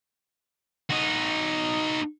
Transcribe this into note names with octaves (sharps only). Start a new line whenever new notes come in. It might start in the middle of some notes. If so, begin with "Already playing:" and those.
D#4 F#4